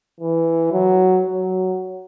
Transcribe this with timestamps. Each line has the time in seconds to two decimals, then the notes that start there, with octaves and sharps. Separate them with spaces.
0.20 E3
0.72 F#3
1.26 F#3